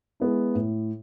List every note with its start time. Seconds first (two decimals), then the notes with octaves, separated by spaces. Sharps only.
0.20 G#3 B3 E4
0.55 A2